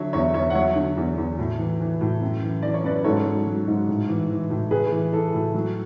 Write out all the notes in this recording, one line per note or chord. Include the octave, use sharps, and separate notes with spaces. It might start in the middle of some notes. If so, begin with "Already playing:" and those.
Already playing: D3 F#3 C#5 E5
E2 C#5 E5
E2 C#5 E5
F#5
F#3 C#5 E5
D3
E2
E2
A2
E3
E3
A2
F#2
E3
E3 D5
C#5
F#2 B4 D5
G#2 A4 C#5
F#3
F#3
G#2
A2
E3
E3
A2
A2 G#4 B4
E3
E3 A4
A2
F#3